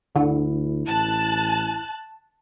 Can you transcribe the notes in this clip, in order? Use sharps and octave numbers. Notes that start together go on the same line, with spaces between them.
D2 D3 E4
A1 A5 F#6